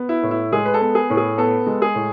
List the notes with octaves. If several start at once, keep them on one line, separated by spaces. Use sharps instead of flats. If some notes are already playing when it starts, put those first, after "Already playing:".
Already playing: B3
E4
A2
E4
G#3 G#4
B4
A4
B3
G#4
A2
G#4
B3 A4
G#3
G#4
A2